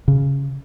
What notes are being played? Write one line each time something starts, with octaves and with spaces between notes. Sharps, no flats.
C#3